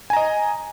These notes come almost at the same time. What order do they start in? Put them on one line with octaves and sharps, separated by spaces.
G#5 A#5 D#5